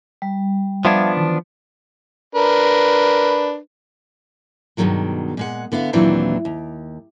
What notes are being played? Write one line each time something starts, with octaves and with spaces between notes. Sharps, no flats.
G3
F3 B3 D4 E5 F5 G#6
D#3 E3
D4 A#4 B4
G2 B2 D3 D#3 F#3 G#3
A#2 G#3 F#5
D3 B3 E4 F5
D#2 A#2 E3 F#3 C4 D4
D#2